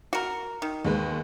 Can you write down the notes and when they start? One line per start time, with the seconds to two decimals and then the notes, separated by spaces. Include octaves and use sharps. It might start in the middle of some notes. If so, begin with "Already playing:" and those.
0.13 F#4 A#4
0.62 D#3
0.85 D#2 G#3 B4